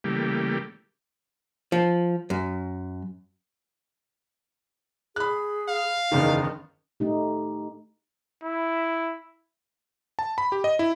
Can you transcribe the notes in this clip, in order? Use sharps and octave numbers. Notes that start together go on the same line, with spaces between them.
C#3 E3 G3 A3 A#3 G4
F3
F#2
G#4 B5 F#6
F5
F#1 E2 D#3 D#4
A3 D#4 G4
E4
A5
B5
G4
D#5
E4